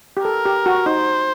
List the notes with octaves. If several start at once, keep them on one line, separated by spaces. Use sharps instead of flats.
G4
A4 A#4
G4
F#4
D#4 C5